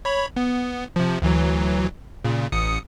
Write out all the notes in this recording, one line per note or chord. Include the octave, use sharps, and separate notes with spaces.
C#5 B5
B3
C3 F3
D2 E3 F#3
A#2 C#3
A1 D#6 C#7